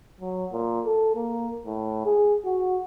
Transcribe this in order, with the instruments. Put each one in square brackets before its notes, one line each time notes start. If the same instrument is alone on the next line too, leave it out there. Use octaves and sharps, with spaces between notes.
[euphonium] F#3
A#2
A4
A#3
A2
G#4
F#4